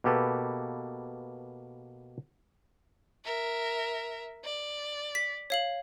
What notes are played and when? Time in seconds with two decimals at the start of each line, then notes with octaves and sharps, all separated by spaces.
0.04 B2 A#3 G4 A4 B4
3.25 A#4 E5
4.44 D5
5.15 B6
5.50 C#5 F5 F#7